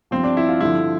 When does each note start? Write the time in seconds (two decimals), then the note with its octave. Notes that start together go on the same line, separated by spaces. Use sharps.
0.11 G2 F3 C4
0.23 D4
0.37 E4
0.48 F4
0.61 G2 D3 F3 E4